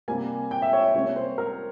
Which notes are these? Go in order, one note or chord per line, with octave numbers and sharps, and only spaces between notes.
C3 G3 A#3 G#5
G5
E5
C#5
E5
C3 G3 A#3 C#4 C#5
C5
A#4